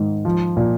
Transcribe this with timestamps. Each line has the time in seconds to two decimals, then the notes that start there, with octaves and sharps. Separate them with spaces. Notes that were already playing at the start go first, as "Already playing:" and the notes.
Already playing: G#2 D#3
0.25 F3
0.57 A#2